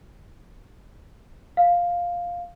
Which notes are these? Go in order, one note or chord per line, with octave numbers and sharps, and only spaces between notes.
F5